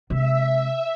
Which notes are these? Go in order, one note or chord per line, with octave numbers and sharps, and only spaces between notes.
C3 G#3 E5